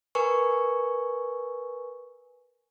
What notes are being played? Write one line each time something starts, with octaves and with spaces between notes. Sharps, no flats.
A#4 B4 G#5 C#6